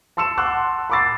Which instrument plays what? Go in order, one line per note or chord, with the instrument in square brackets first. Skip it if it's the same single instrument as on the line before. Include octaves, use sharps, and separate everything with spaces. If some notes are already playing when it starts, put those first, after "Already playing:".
[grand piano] A5 C6 E6 C#7 E7
F#5 A5 C6 D6 E6 F#6
B5 C#6 D6 E6 A6 C7